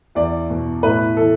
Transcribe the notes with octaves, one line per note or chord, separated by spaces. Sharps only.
E2 D5
B2
A2 B4
E3 A4